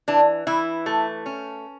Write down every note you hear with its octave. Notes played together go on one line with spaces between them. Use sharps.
E3 D4
E3 E4
A3
C#4